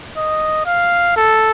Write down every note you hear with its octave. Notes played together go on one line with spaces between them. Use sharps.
D#5
F5
A4